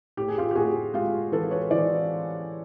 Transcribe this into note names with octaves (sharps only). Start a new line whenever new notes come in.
A2 G4
G#4
F4 G4
G4
A2 F#4 G#4
G#3 F4 G4
E3 A4 B4
B4 C#5
E3 C5 D5